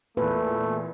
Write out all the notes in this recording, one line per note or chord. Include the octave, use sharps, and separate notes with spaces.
E2 A#2 A3 B4